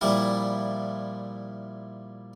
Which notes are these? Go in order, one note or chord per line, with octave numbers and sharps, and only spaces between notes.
A#2 F3 G3 E4